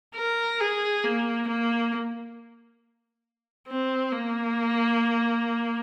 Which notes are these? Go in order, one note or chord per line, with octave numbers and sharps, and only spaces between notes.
A#4
G#4
A#3
A#3
C4
A#3